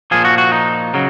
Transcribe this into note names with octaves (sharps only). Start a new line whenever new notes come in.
A#2 F3 G#4
F#4
F#4
D#4
C#3 F#3